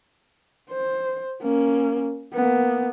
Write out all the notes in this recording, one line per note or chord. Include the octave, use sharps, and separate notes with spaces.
C5
A#3 C#4
A#3 B3